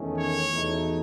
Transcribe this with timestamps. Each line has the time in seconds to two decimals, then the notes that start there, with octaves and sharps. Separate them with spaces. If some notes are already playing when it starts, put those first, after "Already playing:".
Already playing: E2 D#3 A3 C#4
0.18 C#5
0.53 E2 B2 A3 D#4